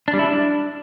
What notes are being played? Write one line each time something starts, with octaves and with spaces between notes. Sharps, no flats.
D4
G3
E4
D4